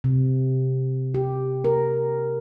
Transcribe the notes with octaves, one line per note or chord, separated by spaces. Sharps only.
C3
G4
A#4